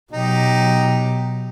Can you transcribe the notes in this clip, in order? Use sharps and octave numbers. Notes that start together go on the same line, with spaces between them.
B2 F#3 D#4 G4